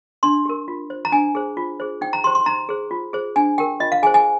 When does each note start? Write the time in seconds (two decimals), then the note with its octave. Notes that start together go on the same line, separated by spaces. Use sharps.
0.23 D4 C6
0.45 G4 A#4
0.68 F4
0.90 C5
1.05 A#5
1.12 D4 G#5
1.35 G#4 C5
1.57 F4
1.80 G#4 C5
2.01 D#4 G5
2.13 A#5
2.24 G4 C5 C6
2.35 C6
2.46 D#4 A#5
2.69 G#4 C5
2.91 F4
3.13 G#4 C5
3.36 D4 G#5
3.58 G4 A#4 G5
3.80 F4 D#5
3.92 F5
4.03 G#4 G#5
4.07 C5
4.14 G#5